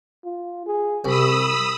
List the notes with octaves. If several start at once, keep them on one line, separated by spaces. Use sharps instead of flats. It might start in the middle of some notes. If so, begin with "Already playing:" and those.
F4
G#4
C2 C3 B5 D#6 E6